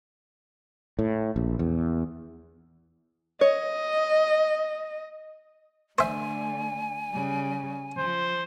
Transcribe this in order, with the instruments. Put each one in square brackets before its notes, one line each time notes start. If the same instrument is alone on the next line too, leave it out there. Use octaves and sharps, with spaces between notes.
[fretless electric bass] A2
A#1
E2
[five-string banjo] C#5 [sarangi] D#5
[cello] D3 A3 [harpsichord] C5 E5 [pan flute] G#5
[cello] C#3 G3
[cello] F3 [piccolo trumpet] C5